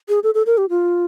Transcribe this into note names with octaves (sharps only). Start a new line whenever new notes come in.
G#4
A4
A4
A#4
G4
F4